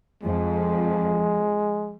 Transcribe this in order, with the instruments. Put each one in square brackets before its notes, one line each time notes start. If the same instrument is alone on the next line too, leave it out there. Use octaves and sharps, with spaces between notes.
[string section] F2 [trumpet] G#3